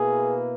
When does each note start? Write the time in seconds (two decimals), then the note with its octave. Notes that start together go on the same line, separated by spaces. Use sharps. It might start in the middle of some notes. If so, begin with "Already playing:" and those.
Already playing: B2 A#3 E4 G#4 B4